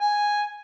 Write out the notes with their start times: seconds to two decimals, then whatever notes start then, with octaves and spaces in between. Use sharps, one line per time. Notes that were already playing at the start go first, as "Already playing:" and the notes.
0.02 G#5